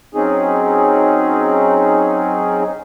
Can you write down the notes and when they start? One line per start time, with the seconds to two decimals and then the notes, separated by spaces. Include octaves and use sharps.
0.14 F#3 C4 C#4 D#4 G#4